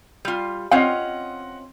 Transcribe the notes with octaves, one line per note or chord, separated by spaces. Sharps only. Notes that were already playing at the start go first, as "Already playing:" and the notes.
G3 F4
C4 C#4 F4 D#5 F#5